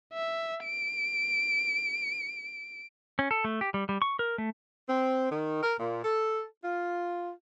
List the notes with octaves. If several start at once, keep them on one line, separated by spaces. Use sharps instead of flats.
E5
D7
C#4
A4
A3
G4
G3
G3
C#6
A#4
A3
C4
D#3
A#4
A#2
A4
F4